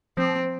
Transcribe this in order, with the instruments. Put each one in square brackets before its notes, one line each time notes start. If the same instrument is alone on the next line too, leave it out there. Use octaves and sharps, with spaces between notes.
[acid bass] F3 [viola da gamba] C4